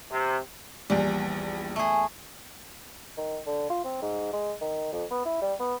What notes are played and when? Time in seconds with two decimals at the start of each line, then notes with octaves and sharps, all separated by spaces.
0.10 C3
0.90 A#1 E2 G3
1.76 A3 G#4
3.17 D#3
3.46 D3
3.70 F4
3.85 C4
4.02 G#2
4.33 G#3
4.61 D#3
4.93 F2
5.11 B3
5.25 E4
5.42 G3
5.60 B3